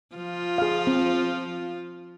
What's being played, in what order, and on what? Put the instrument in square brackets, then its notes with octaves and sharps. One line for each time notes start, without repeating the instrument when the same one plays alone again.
[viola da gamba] F3 F4
[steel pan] G#4 F5
C4